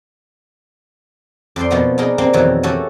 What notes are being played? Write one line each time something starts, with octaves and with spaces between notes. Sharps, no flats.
F2 C5 D5 C6
B2 F3 A#3 B3 D#4
B3 D4 D#4 G#4 A#4
C3 A#3 C4 D4
F2 B2 D#3 E3 F#3
A3 C#4 F#4 G4 A4 C#5